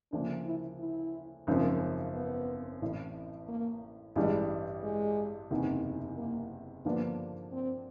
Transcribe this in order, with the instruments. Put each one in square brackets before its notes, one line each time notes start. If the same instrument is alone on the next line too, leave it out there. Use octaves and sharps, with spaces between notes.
[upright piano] D2 C#3 F3 A#3 [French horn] D4
[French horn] E4
E4
[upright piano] G#1 F#2 C#3 F3
[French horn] B3
[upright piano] A1 A2 E3
[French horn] A#3
[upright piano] A1 G2 E3 G3 [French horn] G#3
[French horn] G#3
[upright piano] F#1 E2 C3 D#3
[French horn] A#3
[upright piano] G2 D3 F3 A#3 D4 [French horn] B3
[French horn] C4